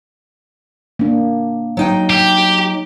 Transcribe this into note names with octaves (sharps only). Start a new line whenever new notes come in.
A#3 D4
F#3 D#4 G5
G4